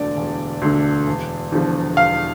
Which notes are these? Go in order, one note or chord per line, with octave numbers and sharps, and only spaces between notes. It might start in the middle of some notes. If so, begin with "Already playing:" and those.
Already playing: E1 D2 D3 D5
E1
D2 D3
E1
E2 D3 F3
E1 F5